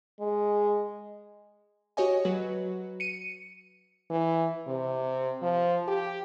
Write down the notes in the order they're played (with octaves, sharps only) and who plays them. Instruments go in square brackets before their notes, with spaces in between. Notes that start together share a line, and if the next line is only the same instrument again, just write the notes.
[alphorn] G#3
[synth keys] F#4 G4 C#5 D#5 G#5
F#3 F#4 B4
C#7 D#7
[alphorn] E3
C3
F3
G4